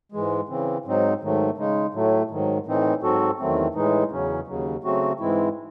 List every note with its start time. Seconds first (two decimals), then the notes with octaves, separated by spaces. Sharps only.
0.12 G#2 E3 G#3
0.48 C#3 E3 C4
0.85 G#2 F#3 C4 D#4
1.21 G#2 D#3 F#3 A3
1.57 C#3 G#3 D#4
1.94 A2 F#3 A3
2.30 G#2 D#3 F#3
2.66 A2 E3 C4 D#4
3.02 G#2 F#3 C4 F#4 A4
3.39 E2 D#3 F#3 A3 C4
3.75 A2 E3 G#3 D#4
4.11 E2 C#3 F#3 C#4
4.47 D#2 C#3 F#3
4.83 C#3 F#3 A3 C4 F#4
5.20 G#2 E3 G#3 C4 E4